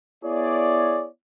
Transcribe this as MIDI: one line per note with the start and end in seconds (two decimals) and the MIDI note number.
0.23 1.07 59
0.23 1.07 64
0.23 1.07 68
0.23 1.07 73
0.23 1.07 74